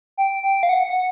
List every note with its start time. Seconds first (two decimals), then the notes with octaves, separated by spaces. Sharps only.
0.17 G5
0.43 G5
0.63 F5
0.69 F#5
0.87 F#5